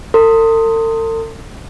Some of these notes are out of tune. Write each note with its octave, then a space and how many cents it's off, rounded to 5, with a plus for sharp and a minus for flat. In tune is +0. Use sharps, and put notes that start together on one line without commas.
A4 +45 C6 +0